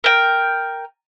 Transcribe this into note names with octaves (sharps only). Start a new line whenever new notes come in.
A#4 G5